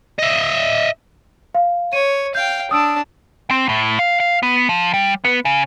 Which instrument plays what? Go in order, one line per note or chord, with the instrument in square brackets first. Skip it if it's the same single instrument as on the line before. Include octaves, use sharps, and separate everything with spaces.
[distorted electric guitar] D#5 E5
[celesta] F5
[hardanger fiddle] C#5 [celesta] D#7
[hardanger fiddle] F5 G5 [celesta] G6
[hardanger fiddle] D4 A5 [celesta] D#6 E6 D7
[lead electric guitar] C4
A2
F5
F5
B3
F3
G3
B3
C#3